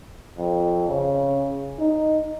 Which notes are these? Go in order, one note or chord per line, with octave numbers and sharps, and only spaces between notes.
F2
C#3
D#4